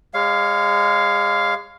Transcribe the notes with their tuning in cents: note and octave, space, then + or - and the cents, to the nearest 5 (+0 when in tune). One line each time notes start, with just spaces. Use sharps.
G#3 -25 C#5 +0 F5 +0